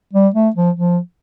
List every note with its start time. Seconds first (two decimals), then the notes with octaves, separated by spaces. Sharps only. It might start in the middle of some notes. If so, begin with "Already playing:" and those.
0.13 G3
0.34 A3
0.56 F3
0.76 F3